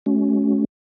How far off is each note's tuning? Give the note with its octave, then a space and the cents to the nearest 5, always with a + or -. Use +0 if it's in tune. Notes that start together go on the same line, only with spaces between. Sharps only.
A3 -45 C#4 +10 F#4 +0